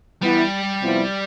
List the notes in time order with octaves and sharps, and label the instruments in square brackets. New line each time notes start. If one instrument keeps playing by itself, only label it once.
[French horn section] E3 B3 E4 [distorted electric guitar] G3
[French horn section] C3 F3 B3 E4